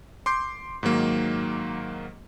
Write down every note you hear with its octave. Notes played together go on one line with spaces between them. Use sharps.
C6 D6 G6 C7
G#2 D#3 F#3 A#3